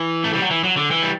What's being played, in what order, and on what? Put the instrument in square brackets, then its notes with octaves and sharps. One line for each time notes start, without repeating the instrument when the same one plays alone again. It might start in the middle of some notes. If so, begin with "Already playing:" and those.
Already playing: [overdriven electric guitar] E3
A3
G3
F#3
E3
F#3
D3
E3
G3